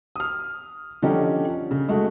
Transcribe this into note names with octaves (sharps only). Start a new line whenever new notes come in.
D#6 F6
D3 F3 C#4 D#4 G4
C#3
G#3 A3 F#4